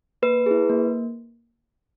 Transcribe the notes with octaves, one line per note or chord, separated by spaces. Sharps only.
A#3 B4
E4 G#4
A#3